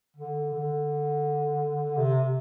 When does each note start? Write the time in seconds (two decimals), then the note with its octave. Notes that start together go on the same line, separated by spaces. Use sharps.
0.16 D3
0.53 D3
1.97 C3